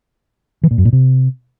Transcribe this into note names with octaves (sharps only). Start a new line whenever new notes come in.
E3
A#2
F#2
A#2
C3